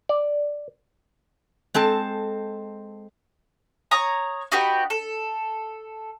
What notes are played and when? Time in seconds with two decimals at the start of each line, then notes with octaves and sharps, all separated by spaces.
0.09 D5
1.74 G#3 C4 A4 A5
3.91 C#5 A#5 D#6
4.52 D#4 F#4 G4 B4
4.90 A4